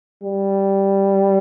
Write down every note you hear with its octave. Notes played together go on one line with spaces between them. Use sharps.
G3